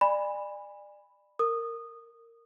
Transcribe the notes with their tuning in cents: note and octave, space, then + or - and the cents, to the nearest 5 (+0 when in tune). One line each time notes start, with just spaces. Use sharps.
D5 +25 G#5 -25 B5 +0
A#4 -15 D#6 -20